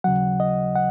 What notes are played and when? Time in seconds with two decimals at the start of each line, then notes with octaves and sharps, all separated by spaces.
0.04 D#2 C#3 F#3 F#5
0.40 D#5
0.76 F#5